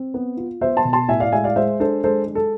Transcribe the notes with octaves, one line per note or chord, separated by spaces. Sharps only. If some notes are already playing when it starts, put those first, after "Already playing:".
Already playing: C4
B3
F4
B3 C5 E5
A5 C6
B2
A5 C6
A2 E5 G#5
D5 F5
G#3 E5 G#5
D5 F5
G#3 C5 E5
D4 A4 C5
G#3 A4 C5
G#3
A4